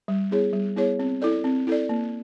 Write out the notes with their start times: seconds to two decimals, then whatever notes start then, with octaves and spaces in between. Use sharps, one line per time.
0.08 G3
0.31 B3 E4 G#4 C#5
0.53 G3
0.76 B3 E4 G#4 C#5
0.99 C4
1.22 E4 A4 D5
1.44 C4
1.67 E4 A4 D5
1.89 A#3